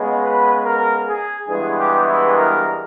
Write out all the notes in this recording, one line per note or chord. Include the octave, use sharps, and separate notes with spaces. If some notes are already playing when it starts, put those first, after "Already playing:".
Already playing: C#3 G#3 B3
B4
A#4
G#4
G2 E3 G#3 B3 G#4
G4
E4
A#4